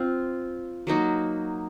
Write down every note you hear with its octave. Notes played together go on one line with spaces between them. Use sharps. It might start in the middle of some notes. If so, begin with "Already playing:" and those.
Already playing: C4 F4
F#3 A#3 D#4 F#4